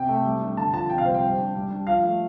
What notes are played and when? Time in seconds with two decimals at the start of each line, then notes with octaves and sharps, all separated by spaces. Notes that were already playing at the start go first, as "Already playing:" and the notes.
Already playing: C3 G5
0.09 A3
0.25 G3
0.42 D4
0.57 D3 A5
0.73 F3 A5
0.90 C3 G5
0.98 F5
1.05 G3 C5
1.14 G5
1.22 G3
1.38 D4
1.55 G3
1.71 D4
1.87 F3 F5
2.04 A3